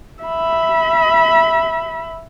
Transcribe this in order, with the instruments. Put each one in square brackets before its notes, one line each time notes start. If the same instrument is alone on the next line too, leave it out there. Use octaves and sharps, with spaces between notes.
[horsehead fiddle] E5 B5